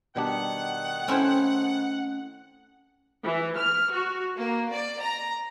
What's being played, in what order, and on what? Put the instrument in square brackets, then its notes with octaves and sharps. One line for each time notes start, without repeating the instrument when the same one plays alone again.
[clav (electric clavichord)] B2 G3 D4 [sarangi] D#3 [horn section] F#5
[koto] A3 C#4 E4 [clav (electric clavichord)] C4 C5
[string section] E3
F6
F#4
A#3
D5
A#5